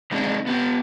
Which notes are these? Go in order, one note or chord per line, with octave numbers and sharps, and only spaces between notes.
C3 G#3 C4 D4 D#4 G#4
B3 G4